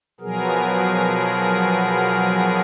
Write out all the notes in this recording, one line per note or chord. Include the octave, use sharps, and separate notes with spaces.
B2 F3 F#3 B3 G#4 A#4